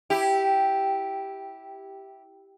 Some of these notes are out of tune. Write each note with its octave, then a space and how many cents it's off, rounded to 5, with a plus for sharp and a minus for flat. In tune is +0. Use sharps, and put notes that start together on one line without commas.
E4 -5 G4 -5